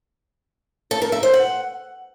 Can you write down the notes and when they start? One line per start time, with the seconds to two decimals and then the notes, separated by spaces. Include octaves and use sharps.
0.91 A4
1.02 A#4
1.12 E5
1.23 C5
1.34 F#5